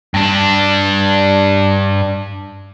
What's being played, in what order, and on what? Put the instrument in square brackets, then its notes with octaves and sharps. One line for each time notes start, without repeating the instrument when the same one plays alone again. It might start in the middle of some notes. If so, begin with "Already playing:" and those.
[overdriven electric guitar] G2 D4